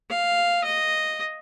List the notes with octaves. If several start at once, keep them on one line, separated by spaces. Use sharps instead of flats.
F5
D#5